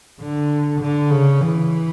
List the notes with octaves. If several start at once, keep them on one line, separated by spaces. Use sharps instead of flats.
D3
D3
C#3
E3